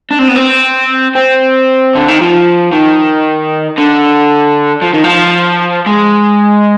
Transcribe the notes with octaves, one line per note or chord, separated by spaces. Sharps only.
D4
C4
B3
C4
C4
D3
D#3
F3
D#3
D3
F3
D#3
F3
G#3